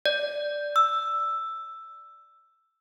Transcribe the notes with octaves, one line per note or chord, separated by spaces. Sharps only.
D5
E6